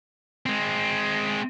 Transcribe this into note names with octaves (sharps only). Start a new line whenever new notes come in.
G#3 C4